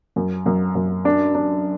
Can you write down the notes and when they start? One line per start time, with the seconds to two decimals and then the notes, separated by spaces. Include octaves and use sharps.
0.16 F#2
0.46 F#2
0.75 F#2
1.05 D4
1.35 D4